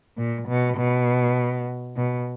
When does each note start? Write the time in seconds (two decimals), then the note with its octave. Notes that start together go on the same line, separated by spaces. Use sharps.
0.17 A#2
0.48 B2
0.77 B2
1.96 B2